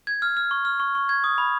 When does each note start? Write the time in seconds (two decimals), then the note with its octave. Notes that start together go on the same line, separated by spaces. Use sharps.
0.07 G#6
0.22 F6
0.37 F6
0.51 C#6
0.65 F6
0.80 C#6
0.95 C#6
1.09 G#6
1.24 D#6
1.38 B5